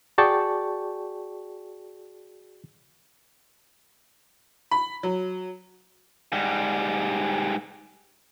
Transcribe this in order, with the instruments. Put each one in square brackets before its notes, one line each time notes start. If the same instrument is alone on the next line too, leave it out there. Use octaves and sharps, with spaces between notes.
[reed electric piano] F#4 G#4 D5 G5 A5 C#6
[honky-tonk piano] B5
F#3
[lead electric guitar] G#2 G3